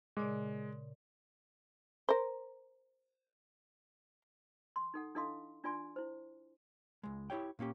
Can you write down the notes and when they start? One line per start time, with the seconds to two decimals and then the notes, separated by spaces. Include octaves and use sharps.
0.17 A#2 C#3 G#3 D5
2.09 A#4 C5
4.76 C6
4.94 D#4 A4 F#5
5.15 D4 E4 A4 D#5 F5 C6
5.64 D4 F4 D5 G#5 C6
5.96 E4 C5
7.03 C#2 G#3
7.30 E4 G4 C#5 G5
7.59 A#2 A#3 C#4 G4